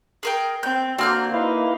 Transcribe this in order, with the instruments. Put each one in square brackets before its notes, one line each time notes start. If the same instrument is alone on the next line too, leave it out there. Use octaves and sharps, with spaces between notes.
[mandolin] G#4 A#4 G5
[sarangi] C4 [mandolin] G6
[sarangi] D3 [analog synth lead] A#3 [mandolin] C4 F6 G6 [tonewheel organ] F#4
[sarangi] D#4 [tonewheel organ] E4 B4 F5